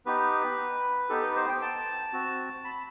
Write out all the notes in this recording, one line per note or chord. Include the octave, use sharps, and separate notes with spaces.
B3 D#4 G4 B4
B3 D#4 G4 A4
B4
C5
G5
A5
C4 F#4
B5